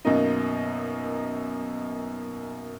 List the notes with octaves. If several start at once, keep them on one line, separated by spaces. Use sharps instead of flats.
F#2 B2 A#3 D#4